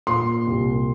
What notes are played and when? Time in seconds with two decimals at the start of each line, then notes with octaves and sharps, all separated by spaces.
0.07 A#2 C6
0.47 C2